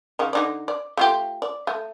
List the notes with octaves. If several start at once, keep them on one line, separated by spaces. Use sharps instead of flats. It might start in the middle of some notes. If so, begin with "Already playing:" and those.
C#3 D#4
D3 D#4 D5
D5
A3 F4 G4
D5
A3